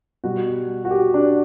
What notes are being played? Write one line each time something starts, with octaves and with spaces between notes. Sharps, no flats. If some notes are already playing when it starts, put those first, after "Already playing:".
B2 G3 F#4
F#4
G4
D4